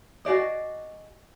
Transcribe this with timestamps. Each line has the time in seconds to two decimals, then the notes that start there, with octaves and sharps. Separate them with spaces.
0.25 F#4 G#4 D5 D#5